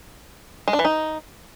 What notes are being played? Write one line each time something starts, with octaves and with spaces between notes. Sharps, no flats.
G#3
D4
E3
D#4